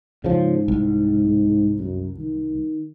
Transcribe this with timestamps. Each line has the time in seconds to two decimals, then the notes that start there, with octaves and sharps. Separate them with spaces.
0.24 G#2 C#3 F3
0.68 C2
1.79 F#2
2.18 D#3